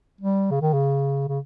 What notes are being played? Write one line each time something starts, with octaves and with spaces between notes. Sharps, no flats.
G3
C#3
D#3
C#3
C#3